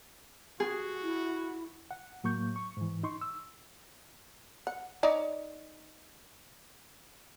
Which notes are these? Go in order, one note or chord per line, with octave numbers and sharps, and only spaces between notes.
F#4 G#4
E4
F#5
A2 F#3 A#3 C#6 G6
C#6
G#2 E3
D#4 C6 C#6
E6
F#5
D#4 C#5 D5